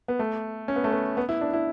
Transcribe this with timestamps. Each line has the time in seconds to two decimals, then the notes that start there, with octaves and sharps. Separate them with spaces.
0.08 B3
0.19 A3
0.68 C#4
0.76 B3
0.84 A3
0.92 B3
1.17 B3
1.29 E4
1.41 D4
1.54 E4